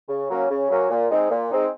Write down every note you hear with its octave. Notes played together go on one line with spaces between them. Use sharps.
C#3
F#3 A#3 C#4
C#3
F#3 A#3 C#4
A#2
G#3 C4 D#4
A#2
G#3 C4 D#4